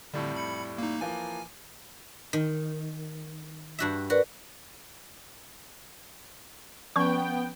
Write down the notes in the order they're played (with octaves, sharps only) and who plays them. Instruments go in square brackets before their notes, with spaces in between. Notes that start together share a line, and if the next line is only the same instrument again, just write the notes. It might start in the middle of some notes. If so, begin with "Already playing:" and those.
[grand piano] F2 A2 G3 [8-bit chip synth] D3
[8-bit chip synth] B5 C#7
A#3 D#4
[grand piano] E3 F3 A#3 [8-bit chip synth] G#5
[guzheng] D#3
G2 F#4 E5
[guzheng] F#4 [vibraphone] A#4 B4 D5
[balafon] F3 C#4 [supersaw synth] B3 G5 [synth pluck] C#6